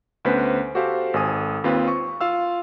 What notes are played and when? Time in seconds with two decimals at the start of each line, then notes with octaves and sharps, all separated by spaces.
0.25 D2 B3 C#4 B4 C5 B6
0.75 F#4 G4 A4 C5 F5
1.14 G#1 A4 G#5 D#6
1.64 D#2 C4 F4 B4
1.88 C#6
2.21 F4 F5 E6